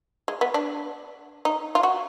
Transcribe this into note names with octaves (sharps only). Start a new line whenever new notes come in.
G#3
B3
D4
D#4
F4
F#4